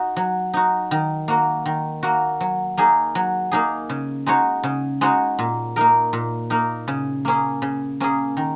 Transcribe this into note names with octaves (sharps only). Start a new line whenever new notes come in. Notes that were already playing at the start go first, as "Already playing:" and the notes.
Already playing: D#4 F#4
F#3
D#4 F#4
D#3
A#3 F#4
D#3
A#3 F#4
F#3
A#3 D#4 G#4
F#3
A#3 D#4 G#4
C#3
G#3 D#4 F#4 C#5
C#3
G#3 D#4 F#4 C#5
A#2
A#3 D#4 A#4
A#2
A#3 D#4 A#4
C#3
A#3 C#4 G#4
C#3
A#3 C#4 G#4
D#3